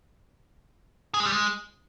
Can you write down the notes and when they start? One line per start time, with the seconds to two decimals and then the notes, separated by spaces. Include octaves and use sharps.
1.14 G#4
1.20 G#3
1.26 G3
1.32 G#3